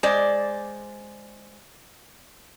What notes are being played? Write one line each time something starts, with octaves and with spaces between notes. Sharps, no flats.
G#3 C5 D5